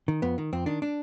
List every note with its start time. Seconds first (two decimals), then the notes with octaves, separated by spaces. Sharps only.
0.08 D#3
0.22 F2 B3
0.38 D#3
0.53 F2 C4
0.66 D#3 D4
0.82 D4